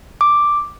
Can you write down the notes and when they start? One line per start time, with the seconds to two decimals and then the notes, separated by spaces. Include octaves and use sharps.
0.21 D6